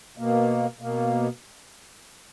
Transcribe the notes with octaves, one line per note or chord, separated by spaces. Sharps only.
B2 A#3
B2 A#3